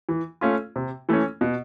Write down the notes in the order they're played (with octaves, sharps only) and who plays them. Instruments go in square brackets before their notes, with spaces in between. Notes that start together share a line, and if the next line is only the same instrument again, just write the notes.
[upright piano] E3
A3 C#4 F4
C3
E3 A3 C#4
B2